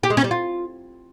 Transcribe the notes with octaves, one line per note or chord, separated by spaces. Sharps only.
G4
G#3
C#4
G3
F4